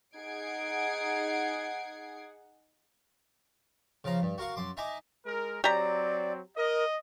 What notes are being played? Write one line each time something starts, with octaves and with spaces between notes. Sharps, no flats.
D#4 G#4 F#5 G#6 C7 D7
C#3 F3 F5 A#5
G2
F#4 A#4 F5 C#6
F#2 C6 D6
D#4 D#5 E5 G#5 A#5 D6
G#3 A#4
F#3 C4 G4 D5 A#5
A#4 D#5